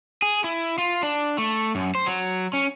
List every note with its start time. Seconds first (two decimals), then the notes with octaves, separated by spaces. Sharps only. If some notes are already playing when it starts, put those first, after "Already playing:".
0.22 G#4
0.44 E4
0.78 F4
1.03 D4
1.38 A3
1.75 F#2
1.95 C5
2.06 F#3
2.53 C#4